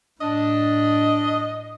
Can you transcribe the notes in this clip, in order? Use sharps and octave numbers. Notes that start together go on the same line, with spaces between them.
A2 D4 D#5